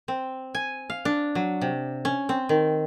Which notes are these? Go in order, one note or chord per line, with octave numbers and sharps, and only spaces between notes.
C4
G#5
F5
D4
F#3
C3
C#4
C4
D#3